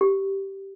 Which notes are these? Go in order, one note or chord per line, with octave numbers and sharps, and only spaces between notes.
G4